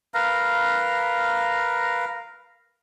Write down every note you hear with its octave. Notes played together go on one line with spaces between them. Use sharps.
A#4 B4 F5 A#5